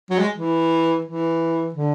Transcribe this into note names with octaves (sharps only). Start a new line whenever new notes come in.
F#3
G#3
E3
E3
D3